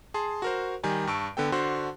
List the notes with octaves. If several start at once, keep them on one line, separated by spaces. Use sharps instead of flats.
G#4 A5 C6
F#4 A#4 C5
D#3 G3 G#5 A#5
G2 A5 C#6 E6 D7
D3 B3 A4 G5
D3 D4 F#4 C5 C6